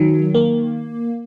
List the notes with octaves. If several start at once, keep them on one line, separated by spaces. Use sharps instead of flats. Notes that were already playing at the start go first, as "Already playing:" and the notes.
Already playing: D#3 F#3
A#3